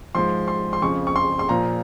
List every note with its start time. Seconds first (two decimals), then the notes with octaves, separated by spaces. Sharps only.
0.15 G#2 F3 C6
0.48 C6
0.73 C6
0.82 F2 C#3 F3 C#6
1.07 C#6
1.16 C6
1.39 C6
1.49 A#2 F3 A#5